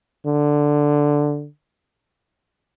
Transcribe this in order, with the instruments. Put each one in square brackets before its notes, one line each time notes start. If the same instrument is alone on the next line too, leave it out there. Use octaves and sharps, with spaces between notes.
[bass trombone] D3